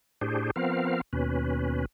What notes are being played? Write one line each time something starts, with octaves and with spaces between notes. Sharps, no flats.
A2 D4 G4 G#4 C5
F3 B3 C4 A#4 F5
D#2 B2 C#4 B4